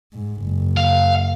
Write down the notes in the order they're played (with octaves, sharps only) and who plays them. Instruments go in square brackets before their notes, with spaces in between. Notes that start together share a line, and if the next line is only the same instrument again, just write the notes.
[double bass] G#2
F#1
[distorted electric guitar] F5